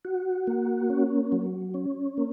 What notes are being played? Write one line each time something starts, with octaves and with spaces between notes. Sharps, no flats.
F#4
A#3
C#4
F#3
C#4
A#3